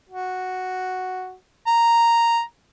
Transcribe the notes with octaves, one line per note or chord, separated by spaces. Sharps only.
F#4
A#5